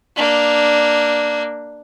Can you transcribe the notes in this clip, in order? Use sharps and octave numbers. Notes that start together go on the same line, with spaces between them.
A#3 D4